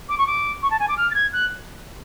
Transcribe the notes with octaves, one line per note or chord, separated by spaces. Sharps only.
D6
C#6
D6
C#6
A5
G#5
D6
F6
A6
G#6
F#6